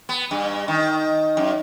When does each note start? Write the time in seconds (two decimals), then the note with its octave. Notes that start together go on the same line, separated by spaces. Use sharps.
0.09 B3
0.31 G2
0.68 D#3
1.37 F#2